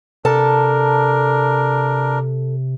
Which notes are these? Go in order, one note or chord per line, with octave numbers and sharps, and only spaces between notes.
C3 D4 A4 A#4 A5